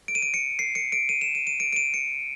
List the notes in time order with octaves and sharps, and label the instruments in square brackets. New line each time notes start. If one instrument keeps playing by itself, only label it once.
[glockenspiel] D7
D#7
D7
C#7
C7
C#7
D7
D#7
E7
D#7
D#7
D7
D7
D#7
C#7